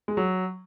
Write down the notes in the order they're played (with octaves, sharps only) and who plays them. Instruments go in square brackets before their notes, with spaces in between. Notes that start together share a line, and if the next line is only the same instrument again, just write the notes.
[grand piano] G#3
F#3